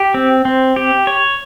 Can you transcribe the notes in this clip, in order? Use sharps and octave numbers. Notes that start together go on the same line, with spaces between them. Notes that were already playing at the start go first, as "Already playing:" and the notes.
Already playing: G4
C4
C4
G4
C#5